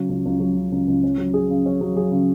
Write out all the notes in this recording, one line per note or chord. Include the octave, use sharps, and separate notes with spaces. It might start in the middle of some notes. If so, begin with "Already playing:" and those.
Already playing: C#3 F#3
C#2
C#2
F#3
C#3
C#2
C#2
C#4
F#3
G#4
C#3
C#4
F#3
G#4
C#3